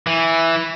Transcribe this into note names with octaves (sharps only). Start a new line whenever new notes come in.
E3